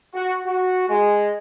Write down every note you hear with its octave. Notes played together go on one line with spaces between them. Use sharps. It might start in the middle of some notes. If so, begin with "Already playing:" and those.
F#4
F#4
G#3